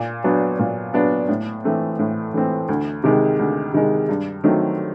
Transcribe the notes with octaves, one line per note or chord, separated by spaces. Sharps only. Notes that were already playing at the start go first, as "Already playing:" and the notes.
Already playing: A#2
F#3 B3 D4
A#2
F#3 B3 D4
A2
E3 A3 C4
A2
E3 A3 C4
D2
C3 D#3 G#3
D2
C3 D#3 G#3
G2
D#3 F#3 A3 C4